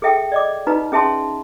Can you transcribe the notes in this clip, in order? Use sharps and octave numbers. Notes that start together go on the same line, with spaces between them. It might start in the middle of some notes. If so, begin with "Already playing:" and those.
G#4 A4 E5 G5
D5 D#5 D6
D#4 F4 B4 A#5
C#4 G#4 E5 A5 C6